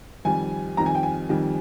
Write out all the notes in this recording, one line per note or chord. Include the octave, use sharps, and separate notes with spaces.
F2 D#3 G3 G#5
F2 D#3 G3 A#5
G#5
G5
G#5
F2 D#3 G3